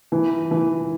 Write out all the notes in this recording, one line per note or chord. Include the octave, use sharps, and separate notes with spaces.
E3
E3